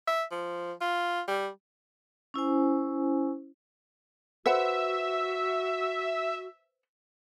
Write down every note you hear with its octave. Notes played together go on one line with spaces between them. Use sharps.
E5
F3
F4
G3
C#4 E4 C5 G#5
F#4 B4 C5 E5 F#5